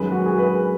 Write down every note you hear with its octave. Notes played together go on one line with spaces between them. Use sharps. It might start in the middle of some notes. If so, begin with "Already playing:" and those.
Already playing: F#2 D#3 G#3 B4
F#4
G#4
B4